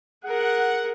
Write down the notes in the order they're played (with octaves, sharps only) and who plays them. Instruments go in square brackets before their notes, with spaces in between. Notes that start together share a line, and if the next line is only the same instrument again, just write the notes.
[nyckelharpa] G#4 A#4 [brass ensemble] F#5